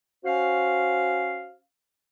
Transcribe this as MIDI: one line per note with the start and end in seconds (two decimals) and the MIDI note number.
0.25 1.54 61
0.25 1.54 66
0.25 1.54 72
0.25 1.54 77